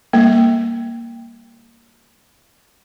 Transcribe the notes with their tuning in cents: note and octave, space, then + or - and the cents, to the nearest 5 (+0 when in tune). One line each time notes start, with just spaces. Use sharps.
G3 +25 A#3 +0